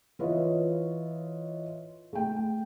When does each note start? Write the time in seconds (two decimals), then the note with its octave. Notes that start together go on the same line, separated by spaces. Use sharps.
0.19 E3 F4 B4 C#5 D#5 E5
2.13 A3 G5